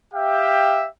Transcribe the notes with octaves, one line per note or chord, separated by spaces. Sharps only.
G4 E5 F5 G5